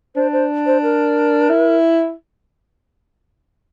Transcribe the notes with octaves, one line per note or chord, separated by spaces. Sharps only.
D4 C5
C5
C5
A#4
E4